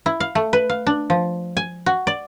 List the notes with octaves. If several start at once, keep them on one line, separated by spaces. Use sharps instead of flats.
E4
F5
A3
B4
F5
D4
F3
G#5
F#4
D5